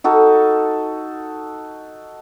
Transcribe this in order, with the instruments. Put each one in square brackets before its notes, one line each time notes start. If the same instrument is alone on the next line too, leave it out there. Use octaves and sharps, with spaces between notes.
[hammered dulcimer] D#4 F#4 A4